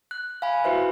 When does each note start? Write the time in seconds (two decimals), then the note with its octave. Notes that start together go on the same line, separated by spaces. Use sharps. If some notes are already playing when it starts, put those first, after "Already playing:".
0.11 F#6
0.42 F5 G#5 B5
0.64 E4 F#4 B4 C5 E5